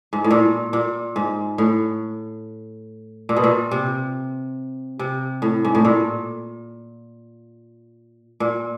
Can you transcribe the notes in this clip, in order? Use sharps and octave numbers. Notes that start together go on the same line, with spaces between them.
G#2
A2
A#2
A#2
G#2
A2
A#2
B2
A#2
C3
C3
A2
G#2
A2
A#2
A#2